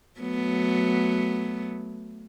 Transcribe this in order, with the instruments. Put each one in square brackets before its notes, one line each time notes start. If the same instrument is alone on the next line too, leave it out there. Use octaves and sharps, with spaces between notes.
[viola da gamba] F#3 A3 B3